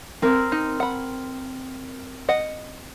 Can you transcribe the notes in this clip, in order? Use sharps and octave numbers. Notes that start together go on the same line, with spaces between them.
C4 A#4
D#4
F#5 B5
D#5 F#5